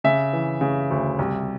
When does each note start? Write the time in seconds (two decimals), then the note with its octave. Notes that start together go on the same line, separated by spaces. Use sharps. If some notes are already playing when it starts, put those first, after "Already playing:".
0.04 C#3 E5
0.33 E3
0.61 C#3
0.90 D2
1.19 C2